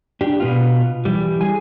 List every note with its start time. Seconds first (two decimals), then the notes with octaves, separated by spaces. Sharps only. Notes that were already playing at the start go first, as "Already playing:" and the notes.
0.21 D4 G4
0.40 B2 B3 F4
1.05 E3 G3
1.41 G#4 G#5